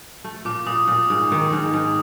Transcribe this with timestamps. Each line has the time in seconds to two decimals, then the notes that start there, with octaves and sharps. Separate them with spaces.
0.24 A3
0.45 A#2 D6
0.66 A#2 D#6
0.88 A#2
1.09 G#2 D#6
1.32 D#3
1.52 G#2
1.74 G#2